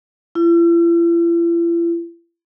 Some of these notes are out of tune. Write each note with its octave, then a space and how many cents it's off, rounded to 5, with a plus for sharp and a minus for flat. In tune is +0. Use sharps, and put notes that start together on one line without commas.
E4 +45